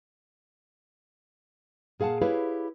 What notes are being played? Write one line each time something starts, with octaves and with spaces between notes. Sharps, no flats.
A#2 G#4 F5 F#5 A5
E4 G4 G#4 B4 C#5 F5